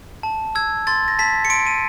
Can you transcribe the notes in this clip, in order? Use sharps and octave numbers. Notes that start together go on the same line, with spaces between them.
A5
E6 G#6
C6 A6
A#6
A5 B6
C#7
C6 D7
D#7